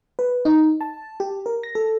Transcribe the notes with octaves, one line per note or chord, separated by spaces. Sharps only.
B4
D#4
A5
G4
A#4
A#6
A4